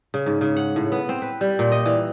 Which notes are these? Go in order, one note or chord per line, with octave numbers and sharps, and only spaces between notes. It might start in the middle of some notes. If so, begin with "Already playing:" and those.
C#3
G#2
C#3
F#5
A2
B3
C4
B4
G3
A#2
D#5
E3